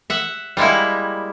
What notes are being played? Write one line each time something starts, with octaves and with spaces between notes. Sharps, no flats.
E5 F#5
G3 G#3 A#3 E4